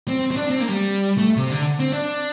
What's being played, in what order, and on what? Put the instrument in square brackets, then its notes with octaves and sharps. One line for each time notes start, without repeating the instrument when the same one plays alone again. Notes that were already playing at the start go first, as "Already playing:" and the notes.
[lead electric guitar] C4
C4
D4
C4
A#3
G3
A3
C3
D3
C4
D4